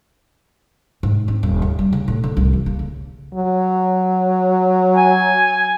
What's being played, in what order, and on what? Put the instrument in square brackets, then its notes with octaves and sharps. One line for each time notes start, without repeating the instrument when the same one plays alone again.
[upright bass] G#2
C4
D#1
D2
G3
C#3
A2
D3
C2
E3
A#3
C#3
[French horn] F#3
[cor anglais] G#5